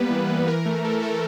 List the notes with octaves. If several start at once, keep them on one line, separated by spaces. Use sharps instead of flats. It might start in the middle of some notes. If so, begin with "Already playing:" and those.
Already playing: G3 A#3 B3 B4
E3
E3
E3 A#4
A3
A3 A4
A3 A4